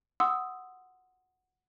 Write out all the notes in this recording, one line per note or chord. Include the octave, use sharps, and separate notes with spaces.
F#5 C6 D#6 E6